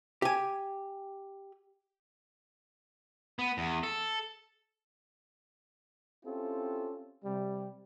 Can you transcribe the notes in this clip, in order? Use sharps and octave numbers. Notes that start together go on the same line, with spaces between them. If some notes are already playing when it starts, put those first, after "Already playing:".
G4 G#5
B3
E2
A4
C4 C#4 E4 F4 G4 A4
C3 G3